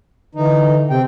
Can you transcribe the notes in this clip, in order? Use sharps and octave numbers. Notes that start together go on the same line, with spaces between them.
D3 E3 D#4
C3 C4 G5